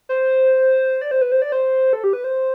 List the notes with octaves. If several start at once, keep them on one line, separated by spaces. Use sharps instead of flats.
C5
D5
C5
B4
C5
D5
C5
A4
G4
B4
C5